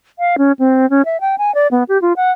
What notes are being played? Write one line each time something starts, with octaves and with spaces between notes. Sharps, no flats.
F5
C#4
C4
C#4
E5
G5
G#5
D5
B3
G4
F4
F#5